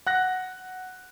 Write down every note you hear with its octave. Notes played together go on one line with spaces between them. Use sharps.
F#5 F#6 A#6